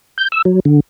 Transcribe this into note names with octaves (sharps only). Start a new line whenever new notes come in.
G6
E6
F#3
D3